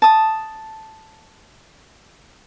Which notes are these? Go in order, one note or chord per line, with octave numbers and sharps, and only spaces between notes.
A5 D#6